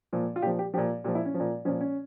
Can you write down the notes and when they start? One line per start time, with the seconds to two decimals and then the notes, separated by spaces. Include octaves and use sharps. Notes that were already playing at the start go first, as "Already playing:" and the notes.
0.13 A#2 F3
0.36 F4
0.42 A#2 F3 G4
0.59 G4
0.74 F3 G4
0.78 A#2
1.04 A#2 G4
1.08 F3
1.15 E4
1.25 C#4
1.34 F3
1.40 A#2
1.65 A#2 F3 C#4
1.81 C#4